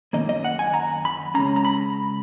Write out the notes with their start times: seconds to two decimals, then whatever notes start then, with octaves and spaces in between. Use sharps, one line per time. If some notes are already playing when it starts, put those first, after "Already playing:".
0.13 F#2 D#3 A#3 D#4 D#5
0.29 D#5
0.45 F#5
0.59 G#5
0.74 A#5
1.05 B5
1.34 C#3 G#3 C#4 A#5
1.56 A#5
1.65 B5